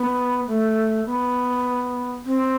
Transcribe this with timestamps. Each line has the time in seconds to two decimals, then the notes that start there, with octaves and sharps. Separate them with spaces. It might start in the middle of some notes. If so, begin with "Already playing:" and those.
Already playing: B3
0.47 A3
1.06 B3
2.25 C4